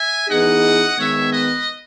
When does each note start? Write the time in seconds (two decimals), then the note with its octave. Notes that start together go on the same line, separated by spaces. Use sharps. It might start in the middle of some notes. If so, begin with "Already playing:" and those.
Already playing: E5 G#5
0.27 E3 B3 D#4 G#4 D#5 F#5
0.97 D#3 G#3 B3 C#5 E5
1.32 B4 D#5